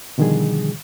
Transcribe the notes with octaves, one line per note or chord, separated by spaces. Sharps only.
B2 D3 D#3 F3 G3 G#4